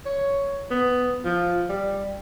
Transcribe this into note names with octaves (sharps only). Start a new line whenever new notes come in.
C#5
B3
F3
G3